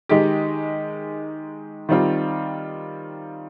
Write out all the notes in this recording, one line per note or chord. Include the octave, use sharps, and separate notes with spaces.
D#3 G#3 D#4 G4
D#3 G3 C4 F4